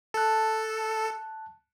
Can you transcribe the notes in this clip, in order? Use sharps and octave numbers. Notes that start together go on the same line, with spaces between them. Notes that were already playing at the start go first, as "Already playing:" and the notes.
A4 A5 F#6